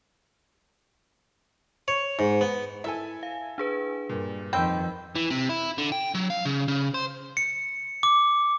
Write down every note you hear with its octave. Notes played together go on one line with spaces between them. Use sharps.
C#5
G#2
B3
E4 A4 E5 G#5
F5
D4 G#4 B4
G2 A#2
F2 D#3 C4 G5 B5 E6 G6
E3
C3
E4
D3
G5
F#3
F5
C#3
C#3
C5
C#7
D6